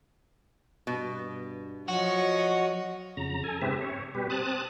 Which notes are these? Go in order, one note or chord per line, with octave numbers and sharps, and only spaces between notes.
G2 B2
F3 F#3 F#4 C#5 D#5
F2 C#3 A#5
A4 G#5
G#2 C#3 C4 G4 B4 E5
C#5
B2 G3 G4 B4
C4 A5 D#6 F#6